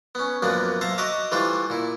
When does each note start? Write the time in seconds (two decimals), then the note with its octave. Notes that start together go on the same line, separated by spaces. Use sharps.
0.15 B3 C#4
0.42 F#2 F3 A#3 B3 D4
0.81 C5 E5 F5 A5 A#5
0.98 F#4 D#5 E5 A#5 D6
1.31 E3 G3 A3 D4 F4 C5
1.70 A#2 E4